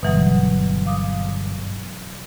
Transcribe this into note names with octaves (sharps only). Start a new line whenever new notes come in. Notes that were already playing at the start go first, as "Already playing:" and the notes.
G1 B2 E3 F#3
F5 D6 D#6